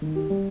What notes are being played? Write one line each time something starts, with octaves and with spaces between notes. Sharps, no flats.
D#3
G4
G3